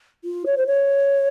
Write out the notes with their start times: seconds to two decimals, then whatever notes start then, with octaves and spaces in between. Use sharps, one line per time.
0.24 F4
0.46 C#5
0.57 C5
0.67 C#5